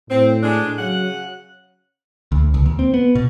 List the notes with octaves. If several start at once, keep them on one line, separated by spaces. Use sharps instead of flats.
A2 C4
G#3 D4
C#3 F#3 F#5
D2
C#2
D#2
C4
B3
B2